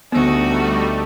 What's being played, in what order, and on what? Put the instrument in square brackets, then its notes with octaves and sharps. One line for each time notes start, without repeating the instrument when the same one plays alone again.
[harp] D2 E6 [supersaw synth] G3 A3 [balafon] B3 [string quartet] D#4 F#4